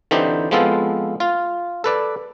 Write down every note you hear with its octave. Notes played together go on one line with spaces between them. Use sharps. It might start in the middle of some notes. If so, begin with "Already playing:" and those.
D3 E3 C4 D#4 G4 C5
F3 G#3 B3 C4 F4 A4
F4
A4 B4 D5